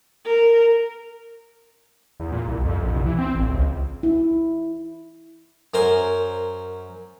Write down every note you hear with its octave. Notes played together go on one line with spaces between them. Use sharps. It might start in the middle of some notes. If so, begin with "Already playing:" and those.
A#4
E2
A#2
C2
F2
A#1
C2
E3
C4
A1
C#2
E4
F#2 A#4 C5 G#5